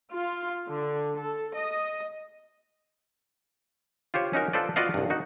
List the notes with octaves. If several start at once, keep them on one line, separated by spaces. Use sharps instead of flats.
F4
D3
A4
D#5
F4 G4 C5 C#5
C#4 D#4 F#4 A#4
F4 A4 B4 C5 D5
F4 F#4 B4 D5 D#5 F5
C2 G2
D#4 F#4